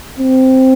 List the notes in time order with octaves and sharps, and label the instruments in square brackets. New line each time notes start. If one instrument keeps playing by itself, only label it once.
[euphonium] C4